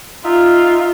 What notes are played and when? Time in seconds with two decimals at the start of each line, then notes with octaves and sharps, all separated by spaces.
0.24 D#4 F4 E5